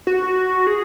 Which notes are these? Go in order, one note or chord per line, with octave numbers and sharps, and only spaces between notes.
F#4
G#4